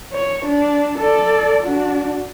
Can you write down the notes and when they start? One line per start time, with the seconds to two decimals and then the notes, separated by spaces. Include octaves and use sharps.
0.13 C#5
0.46 D4
0.99 A4 D5
1.64 D4 F#4